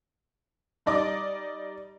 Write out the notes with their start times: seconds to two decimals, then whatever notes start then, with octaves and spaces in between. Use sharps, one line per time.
0.86 G3 D#4 D5 D#5 D6